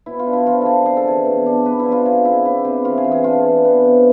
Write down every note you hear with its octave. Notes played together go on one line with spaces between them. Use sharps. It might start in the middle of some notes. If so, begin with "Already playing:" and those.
B2 E4
F4
D4
E4
F3 F4
D3 G#4 A4
C3 G#4
A4
E3 G#4
B2
D4
B3 B4
E4
F3
F4
C3 G#4
C3 E4
B3 E4
C3 G#4
E3 F4
G#4
E3
G#4
D4 F4
E3
B3
C3